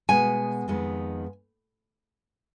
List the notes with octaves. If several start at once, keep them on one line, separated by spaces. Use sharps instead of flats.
B2 G#3 B3 G#5
F2 D#3 G#3 B3